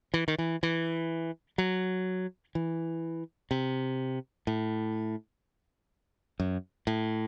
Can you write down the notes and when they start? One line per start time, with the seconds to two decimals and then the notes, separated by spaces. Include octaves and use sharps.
0.14 E3
0.28 D#3
0.38 E3
0.63 E3
1.58 F#3
2.55 E3
3.51 C3
4.47 A2
6.40 F#2
6.87 A2